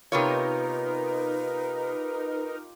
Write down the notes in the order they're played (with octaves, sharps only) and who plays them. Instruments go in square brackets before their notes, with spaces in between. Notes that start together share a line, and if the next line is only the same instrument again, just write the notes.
[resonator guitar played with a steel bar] C3 B3 C#5 [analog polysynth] D#4 A#4 [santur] F4 G4 [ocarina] B4